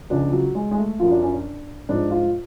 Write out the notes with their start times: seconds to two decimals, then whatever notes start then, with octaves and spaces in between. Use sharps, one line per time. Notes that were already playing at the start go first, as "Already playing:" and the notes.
0.10 C#2 C#3 F3 D4
0.33 F#3
0.55 G#3
0.71 G#3
0.77 A3
0.99 F#2 F3 F4
1.11 D4
1.22 C#4
1.33 D4
1.89 G#2 F3 D4
2.11 F4